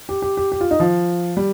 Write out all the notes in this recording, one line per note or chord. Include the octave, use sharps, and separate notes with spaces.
G4
G4
G4
G4
F4
D#4
F3
G3